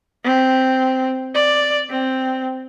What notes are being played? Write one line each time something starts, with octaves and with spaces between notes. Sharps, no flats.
C4
D5
C4